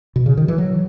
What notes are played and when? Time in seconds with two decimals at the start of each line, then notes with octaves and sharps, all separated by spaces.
0.16 B2
0.26 C#3
0.37 D#3
0.48 E3
0.58 F#3